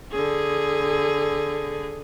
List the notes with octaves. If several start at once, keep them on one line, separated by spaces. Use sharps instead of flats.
D3 G#4